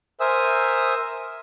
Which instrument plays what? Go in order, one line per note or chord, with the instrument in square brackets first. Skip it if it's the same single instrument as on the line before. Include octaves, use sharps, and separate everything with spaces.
[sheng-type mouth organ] A#4 C5 E5 G#5 D#6 E6